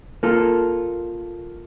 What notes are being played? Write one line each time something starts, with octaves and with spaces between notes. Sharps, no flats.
A#3 F4 A4